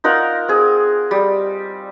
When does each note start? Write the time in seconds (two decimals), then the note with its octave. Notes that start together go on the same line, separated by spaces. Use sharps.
0.04 D#4 F4 A#4 F#5
0.48 C4 G#4
1.11 G3